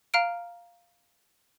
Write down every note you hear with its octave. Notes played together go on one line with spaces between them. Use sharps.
F5 A#5 F6 D7